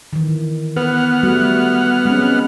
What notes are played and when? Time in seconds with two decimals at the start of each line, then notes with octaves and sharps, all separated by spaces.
0.13 D#3 E3
0.76 B3 B4 F#5 F6
1.23 G3 A3 F#4
2.05 G#3 C4 C#4